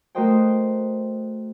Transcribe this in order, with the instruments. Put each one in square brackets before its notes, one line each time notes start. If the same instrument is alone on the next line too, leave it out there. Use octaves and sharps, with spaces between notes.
[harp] A3 F#4 A#4 C5 D#5 G5